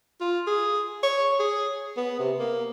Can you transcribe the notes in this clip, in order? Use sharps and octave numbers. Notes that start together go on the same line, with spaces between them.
F4
G#4
C#5
G#4
B3
C3
A#3